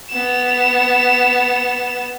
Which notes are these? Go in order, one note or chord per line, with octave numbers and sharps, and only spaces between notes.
B3 E7